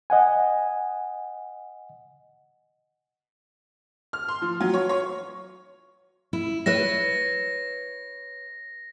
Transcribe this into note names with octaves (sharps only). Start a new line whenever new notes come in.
D#5 F#5 G#5
F6
C6
F3
F#3
C#5
C#5
E4
B4 C#5 E5 A#6